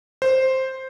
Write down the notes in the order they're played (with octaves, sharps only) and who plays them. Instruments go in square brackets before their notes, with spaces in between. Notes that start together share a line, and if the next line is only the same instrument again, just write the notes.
[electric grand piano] C5